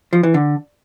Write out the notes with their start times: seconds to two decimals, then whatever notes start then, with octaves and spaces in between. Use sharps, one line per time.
0.13 F3
0.23 E3
0.34 D3